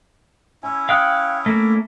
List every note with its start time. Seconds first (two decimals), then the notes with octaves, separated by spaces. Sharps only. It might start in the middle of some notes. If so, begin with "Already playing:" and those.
0.63 C#4 E4 G#5 E6
0.89 F5 G5 D#6 F6 F#6 C#7
1.46 A3 A#3 A#6